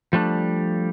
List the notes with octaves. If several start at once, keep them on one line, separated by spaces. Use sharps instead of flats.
F3 G3 A3 D4